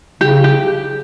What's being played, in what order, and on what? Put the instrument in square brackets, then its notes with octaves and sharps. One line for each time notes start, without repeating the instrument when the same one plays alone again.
[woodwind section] C#3 [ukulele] G4
[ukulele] G4